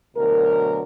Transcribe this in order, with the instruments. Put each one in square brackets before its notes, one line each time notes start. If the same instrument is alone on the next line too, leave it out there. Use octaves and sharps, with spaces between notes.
[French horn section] D2 B2 F#3 A#4